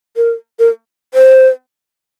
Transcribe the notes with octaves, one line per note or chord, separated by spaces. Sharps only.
A#4
A#4
C5